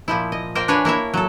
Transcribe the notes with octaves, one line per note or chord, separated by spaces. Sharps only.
A#2 F3 E4
D#5
A#3 A#4 C5 G5
D4 B4 C#5 F5 G#5
A#3 E4 C#5 E5
F#3 A4